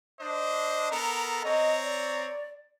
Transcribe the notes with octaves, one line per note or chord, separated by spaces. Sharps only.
D4 C5 D#5
B3 A4 A#4 A#5
C4 C#5 D#5 A#5
D5